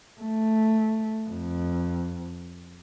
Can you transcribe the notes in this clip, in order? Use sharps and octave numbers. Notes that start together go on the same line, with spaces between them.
A3
F2